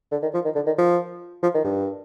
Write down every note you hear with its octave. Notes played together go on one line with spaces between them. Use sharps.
D3
D#3
F3
D#3
D3
D#3
F3
F3
D#3
G2